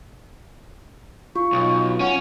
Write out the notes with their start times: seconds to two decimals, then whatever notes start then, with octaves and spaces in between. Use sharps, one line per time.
1.36 F4 C#6
1.52 B1
2.00 C#4 F#5